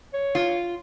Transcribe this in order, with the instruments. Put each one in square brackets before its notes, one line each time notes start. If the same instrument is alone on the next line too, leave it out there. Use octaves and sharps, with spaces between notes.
[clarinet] C#5
[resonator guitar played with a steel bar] F4